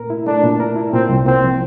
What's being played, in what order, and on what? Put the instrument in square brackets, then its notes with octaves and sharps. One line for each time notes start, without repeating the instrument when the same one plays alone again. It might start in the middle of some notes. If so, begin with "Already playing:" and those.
Already playing: [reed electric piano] A#2 A3 A#4
E4
[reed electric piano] A3 [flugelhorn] D4
[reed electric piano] A#2
A#4
E4
[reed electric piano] A#2 [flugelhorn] C4
[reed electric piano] C2
[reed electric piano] A#3 [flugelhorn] C4
[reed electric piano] F3